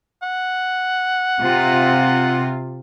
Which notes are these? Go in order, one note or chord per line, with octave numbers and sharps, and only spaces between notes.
F#5
C3 F4